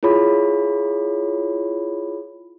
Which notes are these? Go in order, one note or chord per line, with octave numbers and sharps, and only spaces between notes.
E4 F4 G#4 C#5 B5